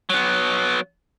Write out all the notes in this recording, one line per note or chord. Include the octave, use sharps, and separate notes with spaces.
F#3 B3